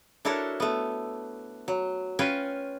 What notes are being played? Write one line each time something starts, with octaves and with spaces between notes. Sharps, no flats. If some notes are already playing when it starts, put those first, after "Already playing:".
D4 E4 F#4 A4 A#4 C#5
A3 B3
F#3
C#4 F4 B4 C#5 G5